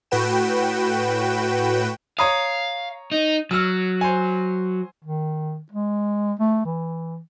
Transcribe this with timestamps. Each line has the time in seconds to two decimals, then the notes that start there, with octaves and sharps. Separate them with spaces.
0.11 A2 F#4 B4 G5 E7
2.19 C#5 F5 A#5 D#6
3.12 D#4
3.51 F#3 E6 F6
4.01 C5 G#5
5.04 D#3
5.72 G#3
6.39 A3
6.65 E3